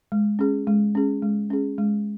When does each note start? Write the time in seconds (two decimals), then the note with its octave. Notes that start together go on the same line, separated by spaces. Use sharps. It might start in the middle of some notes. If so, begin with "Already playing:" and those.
0.12 G#3
0.39 C#4 G#4
0.67 G#3
0.95 C#4 G#4
1.22 G#3
1.50 C#4 G#4
1.78 G#3